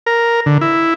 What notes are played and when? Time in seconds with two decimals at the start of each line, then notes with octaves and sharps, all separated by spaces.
0.06 A#4
0.46 D3
0.61 E4